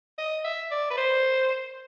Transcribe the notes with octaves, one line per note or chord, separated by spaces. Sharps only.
D#5
E5
D5
B4
C5